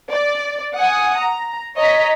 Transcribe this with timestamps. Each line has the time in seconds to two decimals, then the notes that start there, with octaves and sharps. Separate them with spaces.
0.11 D5
0.76 F#5 G#5 D#6
1.18 A#5
1.76 C#5 D#5 A#5 B6